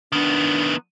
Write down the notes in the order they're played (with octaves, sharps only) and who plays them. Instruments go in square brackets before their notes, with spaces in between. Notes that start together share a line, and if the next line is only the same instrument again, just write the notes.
[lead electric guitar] D#3 B3 [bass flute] D4